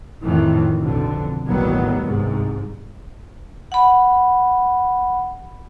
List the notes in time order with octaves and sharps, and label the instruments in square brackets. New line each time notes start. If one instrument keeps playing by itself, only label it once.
[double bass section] F2 A2 D#3 E3
B1 F2 D3
A1 D#2 D#3 F#3 G3 B3
C2 G#2
[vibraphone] F#5 B5